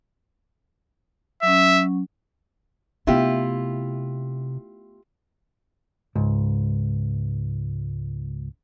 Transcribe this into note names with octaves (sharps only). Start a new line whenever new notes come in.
F#3 C#4 E5
C3 A3 B3 E4 F4 G4
C#2 G#2